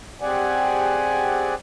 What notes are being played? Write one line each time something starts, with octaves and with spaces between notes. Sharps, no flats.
C4 G4 G#4 D5 F#5 G#5